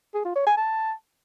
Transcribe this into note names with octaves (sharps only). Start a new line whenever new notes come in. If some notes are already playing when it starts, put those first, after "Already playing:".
G#4
F4
C#5
G#5
A5